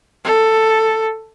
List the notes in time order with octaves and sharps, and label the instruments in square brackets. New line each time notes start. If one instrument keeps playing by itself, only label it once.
[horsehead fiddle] A4